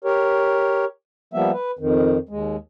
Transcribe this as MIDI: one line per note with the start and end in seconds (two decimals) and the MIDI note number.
0.04 0.85 67
0.04 0.85 70
0.04 0.85 73
1.34 1.51 53
1.34 1.51 55
1.34 1.51 58
1.34 1.51 59
1.34 1.51 76
1.53 1.71 71
1.79 2.18 41
1.79 2.18 51
2.29 2.57 39
2.29 2.57 56